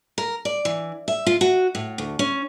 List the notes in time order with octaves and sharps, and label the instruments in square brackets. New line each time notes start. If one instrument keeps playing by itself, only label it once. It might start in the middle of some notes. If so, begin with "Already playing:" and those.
[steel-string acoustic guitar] A#4
D5
E3
E5
F4
F#4
A2
D2
C#4